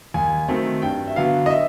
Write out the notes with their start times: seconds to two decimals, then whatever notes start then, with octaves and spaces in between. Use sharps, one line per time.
0.14 D#2 G#5
0.48 D#3 F#3 A3 C4
0.82 G2 G5
1.08 E5
1.16 D3 F#3 B3 F5
1.46 D#5
1.50 E5